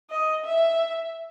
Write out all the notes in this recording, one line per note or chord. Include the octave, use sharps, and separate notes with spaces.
D#5
E5